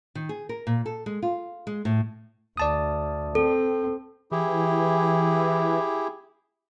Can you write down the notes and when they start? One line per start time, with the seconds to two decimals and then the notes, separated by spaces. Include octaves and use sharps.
0.15 D#3
0.29 G#4
0.49 A#4
0.67 A#2
0.86 A4
1.06 G#3
1.22 F4
1.67 G#3
1.85 A2
2.57 D2 D5 A5 D#6
3.35 C4 A4
4.31 E3 E4 G4 G#4